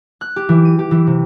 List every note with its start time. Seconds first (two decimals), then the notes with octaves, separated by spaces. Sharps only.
0.21 F#6
0.36 G4
0.49 E3
0.65 D#7
0.79 G4
0.91 E3
1.07 C3